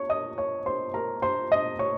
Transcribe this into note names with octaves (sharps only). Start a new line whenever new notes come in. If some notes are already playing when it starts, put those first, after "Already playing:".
Already playing: C#5 C#6
D#5 D#6
C#5 C#6
C5 C6
A#4 A#5
C5 C6
D#5 D#6
C#5 C#6